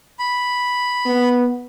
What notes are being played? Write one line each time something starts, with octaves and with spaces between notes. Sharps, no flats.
B5
B3